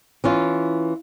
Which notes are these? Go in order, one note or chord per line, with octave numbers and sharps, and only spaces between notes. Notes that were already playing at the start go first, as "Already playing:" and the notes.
E3 C#4 F4